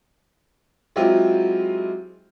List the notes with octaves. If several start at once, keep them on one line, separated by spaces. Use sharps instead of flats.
F#3 G#3 C4 E4 F4 G4